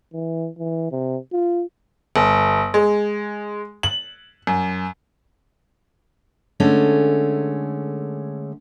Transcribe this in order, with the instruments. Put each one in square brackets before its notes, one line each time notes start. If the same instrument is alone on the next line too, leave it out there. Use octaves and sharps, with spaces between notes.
[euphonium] E3
E3
C3
F4
[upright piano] G1
G#3
F#7
F#2
[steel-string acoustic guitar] D3 G#3 A3 C#4